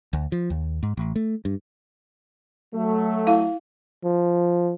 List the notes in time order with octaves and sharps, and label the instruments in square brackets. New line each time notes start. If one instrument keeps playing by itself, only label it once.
[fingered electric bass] D2
F3
D#2
G#2
A1
A3
G2
[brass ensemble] F#3 A3
[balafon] E4 F5
[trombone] F3